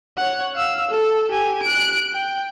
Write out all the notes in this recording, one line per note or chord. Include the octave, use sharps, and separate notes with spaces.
C#5 F#5
F5 E6
A4
G4 G#5
F#6 D7
G5